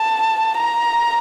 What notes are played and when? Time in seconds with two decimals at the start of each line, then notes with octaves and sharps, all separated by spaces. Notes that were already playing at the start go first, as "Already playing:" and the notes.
Already playing: A5
0.57 A#5